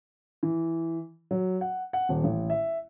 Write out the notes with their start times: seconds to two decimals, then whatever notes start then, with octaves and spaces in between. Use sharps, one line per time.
0.43 E3
1.31 F#3
1.61 F#5
1.93 F#5
2.09 D#1
2.24 A1
2.50 E5